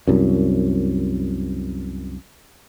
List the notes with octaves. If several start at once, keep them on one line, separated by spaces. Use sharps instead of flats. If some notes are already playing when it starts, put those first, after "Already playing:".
C2 F#2